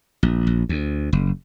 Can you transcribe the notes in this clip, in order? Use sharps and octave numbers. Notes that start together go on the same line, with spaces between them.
A#1
A#1
D2
F#1